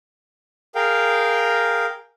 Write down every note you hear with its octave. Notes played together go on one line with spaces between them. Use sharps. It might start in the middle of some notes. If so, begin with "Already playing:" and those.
G#4 A#4 F5 G5